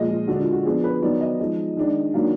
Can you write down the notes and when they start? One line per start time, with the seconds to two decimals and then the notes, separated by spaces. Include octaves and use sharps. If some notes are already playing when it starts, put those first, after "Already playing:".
Already playing: A#2 F3 G#3 D#5
0.10 F4
0.28 D3 G#3 D4 F#4
0.40 F4
0.53 F#4
0.65 F3 B3 D4 G#4
0.84 B4
1.02 D#3 F#3 B3 D#4 D5
1.21 D#5
1.39 F3 G#3 D#4
1.77 D#3 G#3 D4
2.14 D#3 F#3 A#3 D4 F5